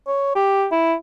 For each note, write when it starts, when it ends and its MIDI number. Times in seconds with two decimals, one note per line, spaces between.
0.07 0.34 73
0.35 0.67 67
0.72 0.94 64